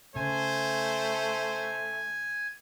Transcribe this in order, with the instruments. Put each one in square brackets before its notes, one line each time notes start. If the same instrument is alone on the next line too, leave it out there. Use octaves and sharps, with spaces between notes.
[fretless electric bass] C#3 [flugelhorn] A3 [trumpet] C5 [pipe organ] G#5